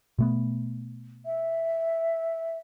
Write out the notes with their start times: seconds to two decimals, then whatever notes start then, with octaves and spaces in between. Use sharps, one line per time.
0.19 B2 A3 B3
1.25 E5